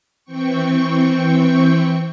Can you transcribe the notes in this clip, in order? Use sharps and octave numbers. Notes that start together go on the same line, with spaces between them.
E3 C4 G5 C#6